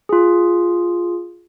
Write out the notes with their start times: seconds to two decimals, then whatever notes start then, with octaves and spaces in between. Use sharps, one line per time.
0.09 F4 G#4